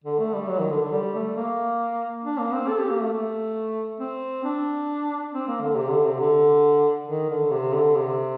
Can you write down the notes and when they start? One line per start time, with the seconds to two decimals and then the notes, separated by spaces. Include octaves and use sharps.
0.04 D3
0.19 A3
0.34 G3
0.48 F#3
0.59 D#3
0.71 D3
0.82 D3
0.92 G3
1.14 A3
1.37 A#3
2.24 D4
2.39 A#3
2.53 C4
2.68 A4
2.80 G4
2.90 A#3
3.01 A3
3.13 A3
4.00 C4
4.44 D4
5.33 C4
5.47 A#3
5.61 D3
5.76 C3
5.90 D3
6.06 C3
6.20 D3
7.08 D#3
7.30 D3
7.52 C3
7.74 D3
7.96 C3